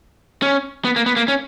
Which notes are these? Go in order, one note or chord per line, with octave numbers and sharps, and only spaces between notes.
C#4
B3
A#3
B3
A#3
C#4